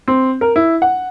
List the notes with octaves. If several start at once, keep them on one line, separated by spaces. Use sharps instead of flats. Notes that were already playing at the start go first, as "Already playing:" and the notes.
C4
A#4
E4
F#5